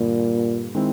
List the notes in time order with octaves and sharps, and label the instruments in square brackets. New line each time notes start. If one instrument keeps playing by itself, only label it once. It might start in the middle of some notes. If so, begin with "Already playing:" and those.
Already playing: [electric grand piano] G2 D3 G3 A#3 [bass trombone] A#2
[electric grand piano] D#3 G#3 C4 E4